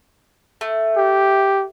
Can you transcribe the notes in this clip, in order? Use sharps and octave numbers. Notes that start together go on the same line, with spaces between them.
A3
G4